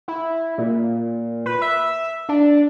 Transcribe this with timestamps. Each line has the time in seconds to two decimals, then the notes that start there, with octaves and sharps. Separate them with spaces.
0.08 E4
0.58 A#2
1.46 B4
1.62 E5
2.29 D4